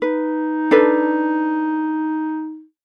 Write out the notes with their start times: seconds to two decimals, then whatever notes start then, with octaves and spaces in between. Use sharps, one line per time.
0.02 D#4 B4
0.71 D4 A4 B4